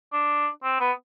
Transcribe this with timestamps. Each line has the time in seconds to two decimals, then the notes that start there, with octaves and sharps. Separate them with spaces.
0.13 D4
0.63 C4
0.80 B3